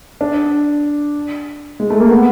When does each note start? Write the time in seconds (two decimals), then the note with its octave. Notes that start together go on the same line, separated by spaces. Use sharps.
0.21 D4
1.80 G#3
1.90 A3
2.00 A#3
2.11 B3